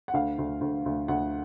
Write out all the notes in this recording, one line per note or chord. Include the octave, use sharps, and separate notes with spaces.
F#5
D2 F5
D2
D2
D2
D2 F#5